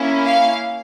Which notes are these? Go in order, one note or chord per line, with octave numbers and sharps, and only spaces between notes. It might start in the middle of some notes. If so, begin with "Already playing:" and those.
Already playing: A#3 C#4 E4
F5